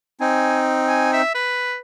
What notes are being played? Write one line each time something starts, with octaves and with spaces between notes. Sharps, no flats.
C4 D#4 G#5
G#5
E5
B4